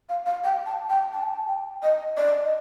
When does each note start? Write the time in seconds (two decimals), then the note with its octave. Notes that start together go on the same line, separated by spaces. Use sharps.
0.09 F5
0.26 F5
0.44 G5
0.66 A5
0.89 G5
1.13 A5
1.23 G5
1.32 A5
1.47 G5
1.83 D#5
2.17 D5
2.43 D#5